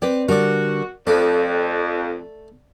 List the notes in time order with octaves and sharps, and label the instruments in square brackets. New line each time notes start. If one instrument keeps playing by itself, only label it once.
[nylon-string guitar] C4 B4 D5 [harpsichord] G4
[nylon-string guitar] D3 G3 [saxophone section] F#4 [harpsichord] A#4 D5
[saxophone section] F2 [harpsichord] A3 A4 [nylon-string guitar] D5